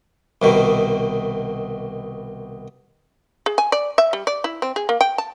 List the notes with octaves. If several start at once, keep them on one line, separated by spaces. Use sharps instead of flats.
C2 B2 D#3
G#4
G#5
D5
E5
G3
D5
E4
C4
G#4
A#3
G5
A5